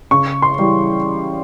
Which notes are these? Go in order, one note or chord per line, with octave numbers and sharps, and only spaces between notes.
C#3 C#6
C6
E3 G3